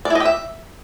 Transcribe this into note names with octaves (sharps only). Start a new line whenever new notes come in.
D5
E4
D#5
G4
E5